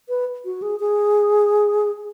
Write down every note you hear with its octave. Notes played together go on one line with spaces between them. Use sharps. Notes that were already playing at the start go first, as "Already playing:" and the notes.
B4
F#4
G#4
G#4